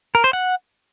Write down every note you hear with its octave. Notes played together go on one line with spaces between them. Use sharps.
A#4
C5
F#5